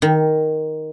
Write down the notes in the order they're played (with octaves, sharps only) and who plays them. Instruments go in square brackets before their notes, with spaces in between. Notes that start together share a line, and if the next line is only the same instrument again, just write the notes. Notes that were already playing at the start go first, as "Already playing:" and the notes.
[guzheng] D#3